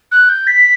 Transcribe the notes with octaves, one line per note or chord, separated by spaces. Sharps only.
F#6
G6
B6